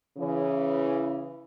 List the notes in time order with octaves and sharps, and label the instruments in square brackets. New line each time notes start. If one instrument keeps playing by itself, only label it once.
[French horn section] C#3 E3